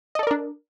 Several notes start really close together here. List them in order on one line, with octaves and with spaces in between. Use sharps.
D#5 A4 D5 A#4 D4